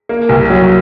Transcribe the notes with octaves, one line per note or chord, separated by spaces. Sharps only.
A#3
C2
F#3